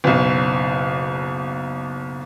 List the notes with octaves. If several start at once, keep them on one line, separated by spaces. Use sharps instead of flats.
F#1 B1